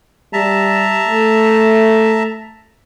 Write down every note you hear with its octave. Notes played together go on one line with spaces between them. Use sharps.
G3 E5 A5 A#5
A3